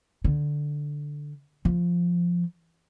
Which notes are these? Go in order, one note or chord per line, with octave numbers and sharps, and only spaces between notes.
D3
F3